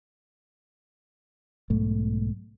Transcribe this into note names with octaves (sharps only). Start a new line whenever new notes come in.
B1 G#2 A3